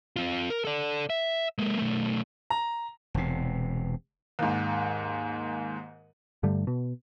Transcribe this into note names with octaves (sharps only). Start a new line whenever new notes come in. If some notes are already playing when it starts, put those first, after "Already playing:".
C4 F4
A#4
A4 D5
E5
G#3 A#3
B1 A3
A#5
E1 C3
D#2 G#2
G2 D3 G3 A3
B2